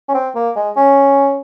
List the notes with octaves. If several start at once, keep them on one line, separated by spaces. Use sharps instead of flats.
C#4
C4
A#3
G#3
C#4